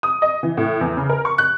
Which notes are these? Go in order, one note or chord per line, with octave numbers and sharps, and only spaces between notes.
D#6
D#5
E3
A2
E2
C#3
A#4
C#6
F#6